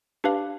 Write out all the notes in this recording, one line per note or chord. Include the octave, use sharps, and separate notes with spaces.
D4 G4 B4 F5